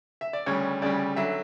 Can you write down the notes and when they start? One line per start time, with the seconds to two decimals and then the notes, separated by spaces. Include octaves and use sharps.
0.21 E5
0.33 D5
0.46 D2 C#3 G3 C#5
0.82 D2 C#3 G3 D5
1.16 D3 F#3 E5